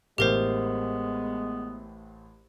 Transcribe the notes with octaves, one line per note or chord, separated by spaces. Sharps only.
A1 A2 G#3 B3 G4 A#4 C5 C7